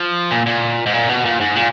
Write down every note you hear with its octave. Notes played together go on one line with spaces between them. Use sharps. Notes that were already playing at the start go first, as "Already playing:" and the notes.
Already playing: F3
A#2
A#2
G#2
A#2
B2
A#2
G#2
A#2